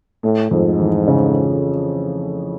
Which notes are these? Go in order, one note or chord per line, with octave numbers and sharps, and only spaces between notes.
A2 A3
F2 G#2
E3
C#3